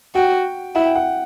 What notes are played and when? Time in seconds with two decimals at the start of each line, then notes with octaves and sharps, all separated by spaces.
0.15 F#4 G5
0.75 E4 F#5
0.86 G5
0.96 F#5